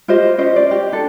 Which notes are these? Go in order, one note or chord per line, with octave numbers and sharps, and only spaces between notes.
F4 G4 C5 D#5
C#4 C5 D#5
D5
G4
D4 A4